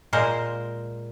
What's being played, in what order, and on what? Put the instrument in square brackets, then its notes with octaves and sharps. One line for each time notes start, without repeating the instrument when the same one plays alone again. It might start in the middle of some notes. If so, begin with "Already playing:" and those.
[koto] A#2 G#3 A#4 C5